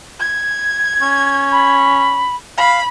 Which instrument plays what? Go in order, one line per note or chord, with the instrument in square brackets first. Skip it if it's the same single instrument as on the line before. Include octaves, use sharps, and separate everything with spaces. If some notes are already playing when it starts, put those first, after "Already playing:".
[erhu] G#6
[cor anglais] C#4
[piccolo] B5
[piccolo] F5 [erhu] B5